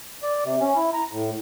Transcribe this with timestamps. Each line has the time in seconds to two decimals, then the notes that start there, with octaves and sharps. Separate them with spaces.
0.23 D5
0.45 C3
0.61 C#4
0.76 E4
0.93 A#5
1.12 A2